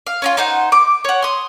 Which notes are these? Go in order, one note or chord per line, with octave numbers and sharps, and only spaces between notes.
F5
C#4 D#4 F4
D#4 C5 F#5
D6
C#5 F#5
C6 D#6